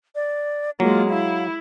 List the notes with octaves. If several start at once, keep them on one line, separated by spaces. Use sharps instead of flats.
D5
F#3 G#3 A#3 F4
E4 F5